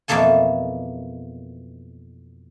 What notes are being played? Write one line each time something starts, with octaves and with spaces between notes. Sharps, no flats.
F2 B2 E3 A#3 A4 G#5